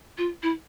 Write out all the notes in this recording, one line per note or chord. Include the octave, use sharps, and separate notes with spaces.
F4
E4